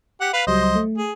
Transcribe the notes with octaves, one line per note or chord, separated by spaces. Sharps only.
G4 F#5
B4 F5
C#2 F#3 G3 C5 D#5
A3
G#4